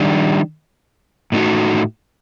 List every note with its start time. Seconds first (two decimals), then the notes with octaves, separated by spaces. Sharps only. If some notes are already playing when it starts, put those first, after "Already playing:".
Already playing: D#3 G3 D4
1.32 A2 A3 D#4 F#4